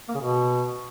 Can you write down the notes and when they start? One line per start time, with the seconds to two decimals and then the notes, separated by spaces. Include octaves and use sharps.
0.09 A#3
0.15 C#3
0.20 B2